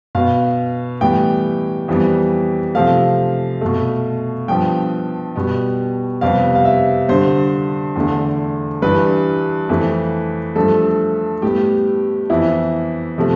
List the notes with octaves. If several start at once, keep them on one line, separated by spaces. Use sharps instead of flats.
B2 B3 F5
A2 E3 G3 B3 G5
F2 E3 G3 B3
C3 F3 A3 F5
B2 A3
G2 F3 B3 G5
B2 G3 B3
F2 C3 G3 B3 F5
F5
E5
G2 D3 G3 C5
E2 D3 A3
G2 E3 G3 B4
F2 E3 A3
G2 F3 A3 A4
A2 G3 B3 G4
F2 E3 B3 E4
C3 F3 A3